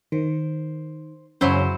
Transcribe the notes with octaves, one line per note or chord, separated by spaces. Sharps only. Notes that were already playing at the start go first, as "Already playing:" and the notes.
D#3 C5
F#2 C#3 F#3 C#4 E4 C5